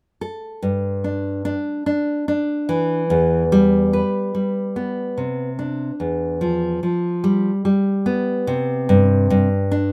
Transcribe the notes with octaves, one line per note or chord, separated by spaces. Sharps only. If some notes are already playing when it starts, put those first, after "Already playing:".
A4
G2
D4
D4
D4
D4
E3
E2
G3
B4
G3
B3
C3
D4
E2
F3
F3
G3
G3
B3
C3
G2
G2
D4